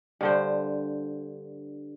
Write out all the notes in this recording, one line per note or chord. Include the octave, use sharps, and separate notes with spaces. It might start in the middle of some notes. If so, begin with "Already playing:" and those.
G2 D3 C5